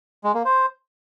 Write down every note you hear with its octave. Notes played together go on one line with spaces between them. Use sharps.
G#3
A#3
C5